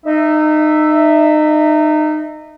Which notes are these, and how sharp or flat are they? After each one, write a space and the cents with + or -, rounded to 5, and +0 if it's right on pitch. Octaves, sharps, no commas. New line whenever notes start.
D#4 -25 E5 +0